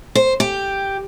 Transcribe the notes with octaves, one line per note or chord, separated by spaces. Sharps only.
C5
G4